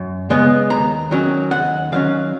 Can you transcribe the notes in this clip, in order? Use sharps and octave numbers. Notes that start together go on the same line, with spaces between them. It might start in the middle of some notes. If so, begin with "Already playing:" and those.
Already playing: F#2
C#3 G#3 B3
D#2 A#5
D#3 F#3 C#4
D#2 F#5
D#3 F#3 C#4 F5